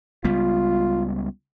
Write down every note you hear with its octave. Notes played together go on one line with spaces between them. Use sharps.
C#2 G3 B3 F4